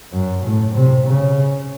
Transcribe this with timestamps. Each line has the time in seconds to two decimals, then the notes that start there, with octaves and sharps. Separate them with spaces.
0.12 F#2
0.44 A2
0.75 C3
1.07 C#3